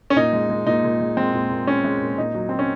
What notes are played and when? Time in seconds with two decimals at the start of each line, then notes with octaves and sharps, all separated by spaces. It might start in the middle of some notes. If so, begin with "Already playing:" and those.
0.10 C#4
0.16 A#2 D#4
0.33 G#3
0.50 G#3
0.66 A#2 D#4
0.84 A#2
1.00 G#3
1.17 G#3 C4
1.34 A#2
1.50 A#2
1.67 G#3 C#4
1.84 G#3
2.01 A#2
2.18 A#2 D#4
2.34 F#3
2.49 F#3 C4
2.59 C#4